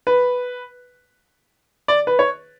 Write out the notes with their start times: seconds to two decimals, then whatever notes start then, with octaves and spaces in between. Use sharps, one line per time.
0.07 B4
1.88 D5
2.07 B4
2.19 C#5